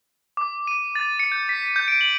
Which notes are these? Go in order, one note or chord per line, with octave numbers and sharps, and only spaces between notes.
D6
D#7
A6
C#7
G6
B6
D#7
G6
D7
F#7